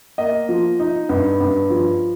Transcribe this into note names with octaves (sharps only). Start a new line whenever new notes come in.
A#3 D#5
F3
D#4
G2
G2
F3